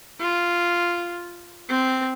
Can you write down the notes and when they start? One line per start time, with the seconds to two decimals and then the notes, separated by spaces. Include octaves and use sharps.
0.20 F4
1.69 C4